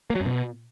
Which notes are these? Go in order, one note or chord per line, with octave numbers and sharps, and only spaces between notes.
A#3
F#3
F#2
B2